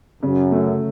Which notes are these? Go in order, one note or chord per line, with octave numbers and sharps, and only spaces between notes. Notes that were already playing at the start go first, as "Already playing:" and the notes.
F#2 C#3
F#3 A3